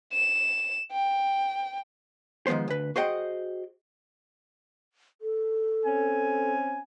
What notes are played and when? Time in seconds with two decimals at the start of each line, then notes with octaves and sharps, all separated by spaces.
0.13 E7
0.92 G5
2.47 D#3 F3 G#3 B3 C5
2.68 D2 B4
2.96 F#4 G#4 C5 D#5 F#5 G5
5.21 A4
5.86 C4 C#4 G#5